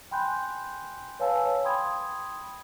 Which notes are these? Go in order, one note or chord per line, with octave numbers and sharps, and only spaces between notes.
G5 G#5 B5 C6 F#6 G6
B4 C#5 F5 G#5 A5 E6
G5 B5 C6 D#6 G#6